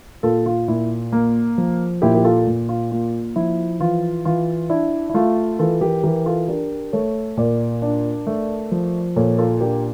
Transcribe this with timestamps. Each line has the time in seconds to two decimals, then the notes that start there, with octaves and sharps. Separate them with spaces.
0.23 A#2 F4 A4
0.46 F4
0.68 A#2 E4
1.12 A#3
1.58 F3
2.02 A#2 E4 G4
2.15 G4
2.24 F4 A4
2.47 A#2
2.69 F4
2.91 A#3 F4
3.36 F3 E4
3.80 E3 F4
4.25 E3 F4
4.70 D4 E4
5.10 E4
5.14 A3 F4
5.59 E3 F4 A4
5.81 G4 A#4
6.03 E3 G4 A#4
6.26 F4 A4
6.48 D4 G4 A#4
6.93 A3 A4 C#5
7.37 A#2 A#4 D5
7.82 D4
8.27 A3
8.72 F3
9.16 A#2 A4 C#5
9.38 F4 A4
9.61 D4 G4 A#4